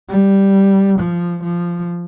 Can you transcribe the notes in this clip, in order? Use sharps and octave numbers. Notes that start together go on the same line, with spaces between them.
G3
F3
F3